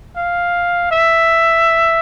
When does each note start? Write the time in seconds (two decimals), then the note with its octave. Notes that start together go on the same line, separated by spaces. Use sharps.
0.17 F5
0.91 E5